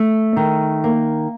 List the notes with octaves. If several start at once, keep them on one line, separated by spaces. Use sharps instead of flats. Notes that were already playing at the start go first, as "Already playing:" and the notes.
Already playing: A3
D#3
A#3